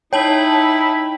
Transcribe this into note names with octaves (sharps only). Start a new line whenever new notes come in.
D#4 E4 C#5 G5 A5 F#7